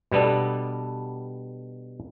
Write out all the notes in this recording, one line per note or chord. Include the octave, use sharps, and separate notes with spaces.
B2 G3 B3 D4 A4